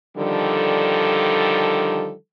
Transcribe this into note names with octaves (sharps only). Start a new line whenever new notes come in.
D3 D#3 F3 G3 A4